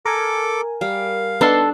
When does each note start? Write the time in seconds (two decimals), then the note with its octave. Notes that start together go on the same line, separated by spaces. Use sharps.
0.06 A4 A#4 G#5 D6
0.81 G3 F5
1.41 B3 D4 D#4 A4 C6